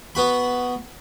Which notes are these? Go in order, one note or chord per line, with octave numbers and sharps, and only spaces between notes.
B3 F#4 B5